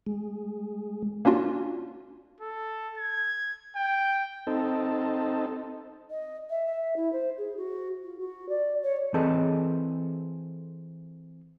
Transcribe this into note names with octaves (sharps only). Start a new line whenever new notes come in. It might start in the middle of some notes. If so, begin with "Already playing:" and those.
G#3
A#3 C#4 D4 F4 F#4
A4
G#6
G5
C4 D#4 A4
D#5
E5
E5
E4
C5
G#4
F#4
F4
F#4
D5
C#5
E3 C4 G#4 A4 B4 D#5